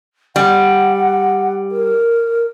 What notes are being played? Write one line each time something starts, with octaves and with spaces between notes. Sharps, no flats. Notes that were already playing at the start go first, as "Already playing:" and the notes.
G3 F#5
A#4